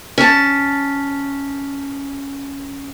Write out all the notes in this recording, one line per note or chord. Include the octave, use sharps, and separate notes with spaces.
C#4 A5